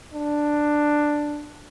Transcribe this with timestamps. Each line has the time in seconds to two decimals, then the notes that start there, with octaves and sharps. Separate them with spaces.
0.14 D4